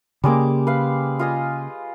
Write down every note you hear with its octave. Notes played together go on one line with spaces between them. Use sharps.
C#3 G3 G#3 A#3 D6
B4 F5
F4 D#5 G#5